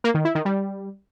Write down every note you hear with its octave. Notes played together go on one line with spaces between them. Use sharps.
A#3
D#3
E4
D#3
G3